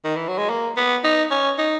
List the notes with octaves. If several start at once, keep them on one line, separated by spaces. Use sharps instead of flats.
D#3
E3
F#3
G#3
A#3
B3
D#4
C#4
D#4